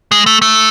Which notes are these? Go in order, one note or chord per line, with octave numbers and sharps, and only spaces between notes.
G#3
A3
A3